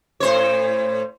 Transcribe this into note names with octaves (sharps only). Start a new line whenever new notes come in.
A2 C5 C#5